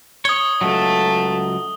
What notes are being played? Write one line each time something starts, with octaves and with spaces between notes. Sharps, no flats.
C#5 D#6 G7
C#2 F#3 A3 A5